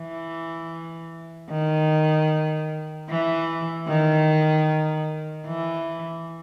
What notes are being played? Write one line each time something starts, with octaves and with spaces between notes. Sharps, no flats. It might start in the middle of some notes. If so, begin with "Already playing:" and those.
Already playing: E3
D#3
E3
D#3
E3